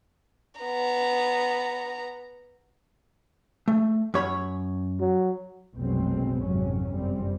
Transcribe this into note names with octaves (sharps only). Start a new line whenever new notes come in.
B3 A#5
A3
F#2 C#5 B5
F#3
F1 A#1 B2 F#3 G#3 C4
G#1 F2 C3 F#3 C#4
G1 F#2 G3 C4